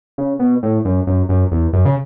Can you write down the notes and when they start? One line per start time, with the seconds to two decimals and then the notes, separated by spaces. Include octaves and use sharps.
0.18 C#3
0.39 B2
0.63 A2
0.85 F#2
1.07 F#2
1.29 F#2
1.52 E2
1.73 F#2
1.85 C#3